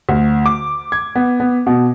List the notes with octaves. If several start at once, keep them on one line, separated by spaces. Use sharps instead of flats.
D2
D6
G#6
B3
B3
B2